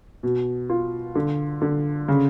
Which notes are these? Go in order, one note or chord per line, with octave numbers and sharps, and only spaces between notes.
B2
F4
D3
D3
C#3